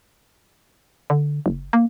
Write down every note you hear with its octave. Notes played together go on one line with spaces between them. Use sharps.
D3
F#1
A#3